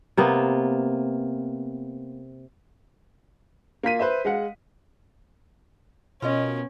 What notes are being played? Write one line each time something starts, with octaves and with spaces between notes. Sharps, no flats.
C3 A#3 B3
A#3 F4 B6 D#7
B4 C5 E5
G#3 F5 F#5
B2 C#4 F4 A#4 D#5